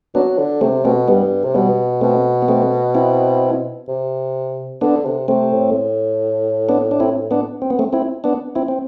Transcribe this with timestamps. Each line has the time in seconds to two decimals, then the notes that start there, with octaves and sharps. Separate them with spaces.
0.15 F#3 B3 D4
0.38 D3
0.61 C3 A3 C4
0.84 B2 A3 C4
1.08 G2 G3 B3
1.44 C3
1.54 B2 G3 B3
2.01 B2 A3 C4
2.42 B3
2.48 A3 C4
2.95 C4 E4
3.88 C3
4.81 D3 B3 D4
5.05 C3
5.28 C3 A3 C4
5.52 A2
6.69 B3 D4
6.91 D4
7.00 C4 E4
7.31 B3 D4
7.62 C4
7.70 B3
7.79 A3 C4
7.93 C4 E4
8.24 B3 D4
8.55 C4 E4
8.68 C4